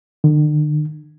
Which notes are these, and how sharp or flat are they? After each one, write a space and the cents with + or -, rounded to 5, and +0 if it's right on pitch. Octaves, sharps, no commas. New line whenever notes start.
D3 +45